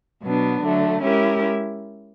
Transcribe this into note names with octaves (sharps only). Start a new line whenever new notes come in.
B2 F#3 B3 D4
D3 F#3 A3
G#3 C#4 E4 G4 A#4